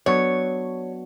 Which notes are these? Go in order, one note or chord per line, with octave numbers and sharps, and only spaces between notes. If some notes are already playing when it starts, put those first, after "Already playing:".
F#3 B3 D4 F#4 C#5